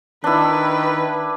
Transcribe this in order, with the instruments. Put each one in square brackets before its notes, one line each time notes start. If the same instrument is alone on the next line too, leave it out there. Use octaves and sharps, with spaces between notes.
[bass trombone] D#3 [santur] D4 E4 [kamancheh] B4